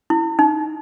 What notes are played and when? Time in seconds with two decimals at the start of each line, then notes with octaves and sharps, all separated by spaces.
0.10 E4
0.39 D#4